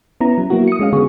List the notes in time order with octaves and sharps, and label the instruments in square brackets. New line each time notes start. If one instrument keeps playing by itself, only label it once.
[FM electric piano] B3 C#4 E4 A#5
F#3
F#3 A#3 B3 E4 F#4
D#6 C#7
G#3 C#4 F5
D3 B3 F#4 G#4 C#6